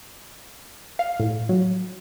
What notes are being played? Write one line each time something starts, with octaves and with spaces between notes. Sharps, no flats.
F5
A2
F#3